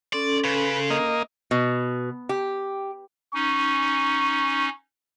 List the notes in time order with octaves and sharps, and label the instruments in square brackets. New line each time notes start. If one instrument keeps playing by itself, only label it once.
[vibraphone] C#4 A4 C6 [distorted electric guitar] D5
[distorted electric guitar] C#3 [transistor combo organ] B4
[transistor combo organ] A#3 D#5
[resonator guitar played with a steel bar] B2
G4
[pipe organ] C#4 D#4 [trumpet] C#6